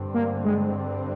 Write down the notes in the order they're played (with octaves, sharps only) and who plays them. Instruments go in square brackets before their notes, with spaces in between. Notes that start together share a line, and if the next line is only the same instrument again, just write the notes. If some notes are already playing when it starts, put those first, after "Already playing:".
Already playing: [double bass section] G2 D3 G3 C4
[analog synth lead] A#3
G#3